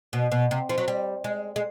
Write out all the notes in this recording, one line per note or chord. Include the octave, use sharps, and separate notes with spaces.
B2
B2
C3
F3
F#3
G3
G#3
G#3